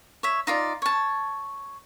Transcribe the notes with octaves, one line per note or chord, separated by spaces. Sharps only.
C#5 E5
D#4 F4 D5
C#5 A5